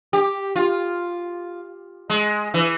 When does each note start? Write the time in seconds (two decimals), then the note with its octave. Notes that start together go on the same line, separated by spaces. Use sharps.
0.13 G4
0.56 F4
2.10 G#3
2.54 E3